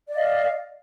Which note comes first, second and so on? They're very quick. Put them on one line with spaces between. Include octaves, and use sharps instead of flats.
D5 D#5 F5